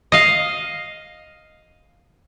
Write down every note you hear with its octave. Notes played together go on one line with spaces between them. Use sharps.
D#5 F5